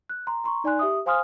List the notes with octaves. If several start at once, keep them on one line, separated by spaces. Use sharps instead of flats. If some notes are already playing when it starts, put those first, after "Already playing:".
F#6
A#5 C6
A#5 C6 C#6
D#4 D5 G#5 C6 F#6
G4 E5 D#6
C5 F5 G#5 C6 D#6 F6